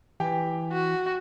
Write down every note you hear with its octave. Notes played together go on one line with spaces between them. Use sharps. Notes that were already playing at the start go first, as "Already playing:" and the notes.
E3 G4 G5 G#5
F#4